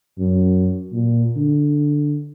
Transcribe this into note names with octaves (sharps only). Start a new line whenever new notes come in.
F#2
A#2
D3